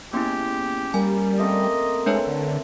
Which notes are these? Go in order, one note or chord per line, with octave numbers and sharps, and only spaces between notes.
A#3 B3 C#4 E4 G4 G#4 C6
G3 A#3 G#5
A3 A#3 C4 D#5
G#3 A3 D4 B4 C#5
D3